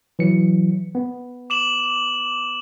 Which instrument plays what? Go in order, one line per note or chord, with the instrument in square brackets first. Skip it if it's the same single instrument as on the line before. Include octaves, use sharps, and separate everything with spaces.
[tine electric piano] E3 F#3 C#7
B3
[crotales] D6 E7 F#7